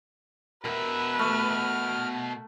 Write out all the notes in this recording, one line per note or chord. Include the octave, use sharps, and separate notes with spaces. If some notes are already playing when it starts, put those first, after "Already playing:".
B2 A#4 B4 E5
A3 F6